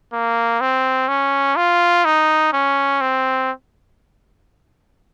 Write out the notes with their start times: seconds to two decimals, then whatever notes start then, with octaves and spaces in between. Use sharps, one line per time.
0.13 A#3
0.61 C4
1.08 C#4
1.56 F4
2.05 D#4
2.53 C#4
3.01 C4